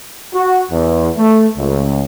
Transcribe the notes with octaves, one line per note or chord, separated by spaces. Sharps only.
F#4
E2
A3
C#2